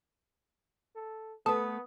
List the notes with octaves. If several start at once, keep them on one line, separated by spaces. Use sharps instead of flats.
A4
A3 B3 A4 B4 D#6